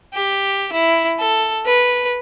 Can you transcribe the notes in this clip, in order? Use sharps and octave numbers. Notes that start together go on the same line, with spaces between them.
G4
E4
A4
B4